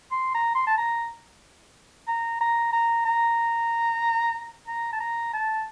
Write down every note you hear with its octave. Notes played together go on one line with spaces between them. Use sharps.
C6
A#5
C6
A5
A#5
A#5
A#5
A#5
A#5
A#5
A5
A#5
A5